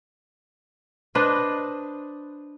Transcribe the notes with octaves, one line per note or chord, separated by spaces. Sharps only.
D4 B4 C5 D#5